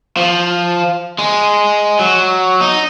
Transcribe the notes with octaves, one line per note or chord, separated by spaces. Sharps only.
F3
G#3
F#3
D#4